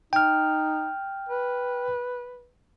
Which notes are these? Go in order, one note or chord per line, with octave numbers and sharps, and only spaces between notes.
D#4 G5 F6
B4